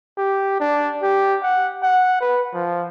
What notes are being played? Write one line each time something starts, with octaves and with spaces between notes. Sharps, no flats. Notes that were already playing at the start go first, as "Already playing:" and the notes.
G4
D4
G4
F#5
F#5
B4
F3